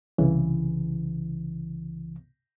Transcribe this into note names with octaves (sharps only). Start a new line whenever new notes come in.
C2 C#3 E3